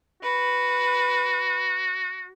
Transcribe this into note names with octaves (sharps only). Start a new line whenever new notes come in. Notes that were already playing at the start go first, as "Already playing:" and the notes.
F#4 B4